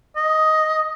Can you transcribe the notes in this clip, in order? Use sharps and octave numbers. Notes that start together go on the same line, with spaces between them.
D#5